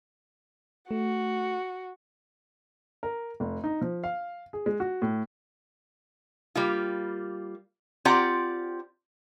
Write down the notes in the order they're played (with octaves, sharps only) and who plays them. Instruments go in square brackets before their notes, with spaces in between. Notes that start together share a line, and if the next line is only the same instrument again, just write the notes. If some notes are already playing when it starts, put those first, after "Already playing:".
[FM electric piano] A3 [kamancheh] F#4
[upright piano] A#4
F1
D#4
F3
F5
G#4
G#3
F#4
A2
[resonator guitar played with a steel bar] G3 A#3 F4
C4 F4 G4 D5 F#5 A#5